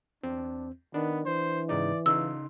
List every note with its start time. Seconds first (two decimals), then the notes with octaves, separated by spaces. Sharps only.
0.23 E2 C4 D4
0.94 D#3 B3 D4
1.26 E3 C5
1.69 G#2 C#3 D#4 D5
2.06 C#3 D#4 F4 C6 E6